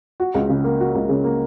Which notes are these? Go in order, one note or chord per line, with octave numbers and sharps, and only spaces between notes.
F#4
C#2
C#3
A#3
F#4
C#2
C#3
A#3